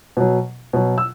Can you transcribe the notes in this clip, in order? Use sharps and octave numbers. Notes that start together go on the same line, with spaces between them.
B2 F#3
B2 F#3
E6